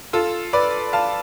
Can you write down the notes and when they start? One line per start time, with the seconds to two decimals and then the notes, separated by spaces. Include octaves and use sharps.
0.13 F4 A4
0.53 B4 D5
0.93 F5 A5